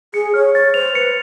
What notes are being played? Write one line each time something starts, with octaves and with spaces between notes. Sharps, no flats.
G#4 C#7
C#5 F6
C#5 A6
C5 F7
B4 C#7